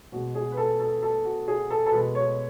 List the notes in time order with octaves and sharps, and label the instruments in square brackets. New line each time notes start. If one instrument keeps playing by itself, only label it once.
[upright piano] B2 G#3 F#4
G#4
B4
A4
A4
A4
F#4
G#4
A4
A4
B2 G#3 B4
C#5